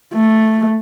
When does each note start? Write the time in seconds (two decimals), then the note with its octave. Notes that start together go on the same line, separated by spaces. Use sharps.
0.14 A3